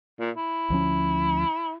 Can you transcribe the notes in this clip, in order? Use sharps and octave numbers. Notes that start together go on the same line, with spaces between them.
A#2
E4
D2 F3 C#4